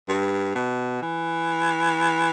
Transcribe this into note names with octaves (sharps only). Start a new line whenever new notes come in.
G2
B2
E3